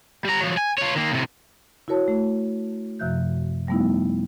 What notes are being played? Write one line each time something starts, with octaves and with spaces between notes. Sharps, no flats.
G3 A#5
F3 F#3
G#5
F4 C#5
D#3 A#3
A2 C3
E4 F#4 A#4 C#5 A5
A3
F#2 C3 F3 E5 F#6 G6
F3 G3 A3 B3 D#4 E4